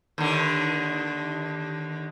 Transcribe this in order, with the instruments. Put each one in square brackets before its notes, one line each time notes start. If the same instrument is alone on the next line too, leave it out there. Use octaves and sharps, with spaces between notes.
[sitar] D#2 D3